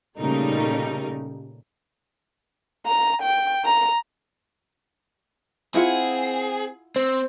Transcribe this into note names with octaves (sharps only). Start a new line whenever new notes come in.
A#2 C#3 G3 A3 D#4 A#4
A#5
G5
A#5
C4 E4 F4 G#4 F#5
C4 C5